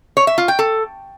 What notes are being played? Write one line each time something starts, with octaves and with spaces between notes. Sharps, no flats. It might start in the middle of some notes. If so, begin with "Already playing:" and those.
C#5
E5
F4
G5
A4